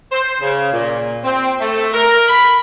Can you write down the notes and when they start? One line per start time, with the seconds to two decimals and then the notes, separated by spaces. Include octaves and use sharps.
0.12 C5
0.42 C#3
0.73 A#2
1.24 C4
1.61 A3
1.93 A#4
2.29 B5